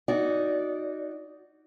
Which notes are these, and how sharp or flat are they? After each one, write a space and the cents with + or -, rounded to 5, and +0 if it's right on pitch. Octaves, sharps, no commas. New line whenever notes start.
D#4 +0 F#4 -5 D5 -20